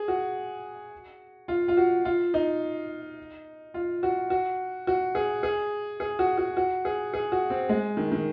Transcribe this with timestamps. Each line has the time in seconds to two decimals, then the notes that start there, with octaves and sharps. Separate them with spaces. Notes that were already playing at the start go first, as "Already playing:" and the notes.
Already playing: G#4
0.08 F#4
1.48 F4
1.68 F4
1.77 F#4
2.05 F4
2.34 D#4
3.74 F4
4.03 F#4
4.30 F#4
4.87 F#4
5.15 G#4
5.43 G#4
6.00 G#4
6.19 F#4
6.38 F#4
6.57 F#4
6.85 G#4
7.14 G#4
7.32 F#4
7.50 C4
7.69 G#3
7.97 D#3
8.12 D#3